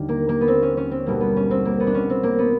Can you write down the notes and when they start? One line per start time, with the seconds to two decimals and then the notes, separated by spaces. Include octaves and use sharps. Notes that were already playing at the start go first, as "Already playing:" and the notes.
Already playing: D#2 D3 G3 D4
0.09 A#3
0.29 A#3
0.41 B3
0.48 C4
0.62 C#4
0.77 C#4
0.91 C4
1.06 B1 B2 G3 A#3
1.21 B3
1.36 C#4
1.51 C4
1.65 A#3
1.80 B3
1.87 D4
1.94 C#4
2.10 C4
2.23 A#3
2.39 B3